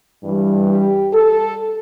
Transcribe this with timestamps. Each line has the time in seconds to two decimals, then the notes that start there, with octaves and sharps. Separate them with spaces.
0.22 G2 E3 G3
0.68 G4
1.13 A4